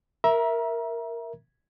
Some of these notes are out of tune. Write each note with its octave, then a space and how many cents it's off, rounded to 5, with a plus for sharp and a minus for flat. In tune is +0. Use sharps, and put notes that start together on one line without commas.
A#4 +0 E5 +0 A#5 +30